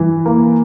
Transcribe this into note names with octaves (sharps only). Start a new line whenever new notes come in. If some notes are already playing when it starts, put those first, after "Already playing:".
Already playing: E3
A#3